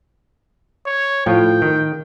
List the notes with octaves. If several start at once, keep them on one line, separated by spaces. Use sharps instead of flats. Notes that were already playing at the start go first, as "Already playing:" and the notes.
C#5
A2 F3 F4 G5
D#3